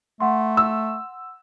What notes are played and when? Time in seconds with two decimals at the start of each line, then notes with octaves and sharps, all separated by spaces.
0.20 A3 F#5 C6
0.57 E6